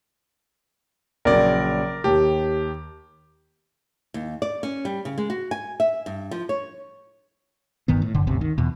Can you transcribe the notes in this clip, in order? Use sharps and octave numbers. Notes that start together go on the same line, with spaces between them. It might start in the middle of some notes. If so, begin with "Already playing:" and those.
A#1 C#3 F#3 A#4 D5
D#2 G4 A5
D#2
D5
C#4
G3
C#3
G#3
F#4
G#5
E5
G2
F3
C#5
G1 G2 D#3 B3
A2
F1 F#2 D3
G1 D2 C3
D#3
E2 B2